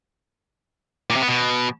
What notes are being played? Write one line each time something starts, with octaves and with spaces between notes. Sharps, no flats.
A#2
C3
B3
B2